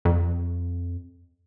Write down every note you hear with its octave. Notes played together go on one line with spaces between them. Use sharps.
F2